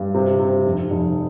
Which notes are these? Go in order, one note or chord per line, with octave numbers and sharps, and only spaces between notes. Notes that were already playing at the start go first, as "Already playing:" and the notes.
Already playing: G2
C3
C3
F1
F1